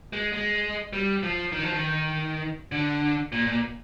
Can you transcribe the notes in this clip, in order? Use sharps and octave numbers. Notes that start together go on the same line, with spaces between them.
G#3
G#3
G3
F3
D#3
F3
D#3
D3
A#2
A#2